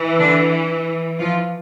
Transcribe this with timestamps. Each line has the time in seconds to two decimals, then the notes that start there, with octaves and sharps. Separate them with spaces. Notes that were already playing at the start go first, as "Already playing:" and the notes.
Already playing: E3
0.18 D3 D4
1.19 F3 F4